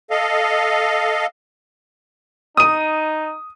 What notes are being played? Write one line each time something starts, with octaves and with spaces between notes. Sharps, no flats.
A4 D#5 F5
D#4 D#6 D#7